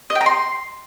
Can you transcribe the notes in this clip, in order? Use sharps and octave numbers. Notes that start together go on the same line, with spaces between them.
D#5
G5
A#5
C6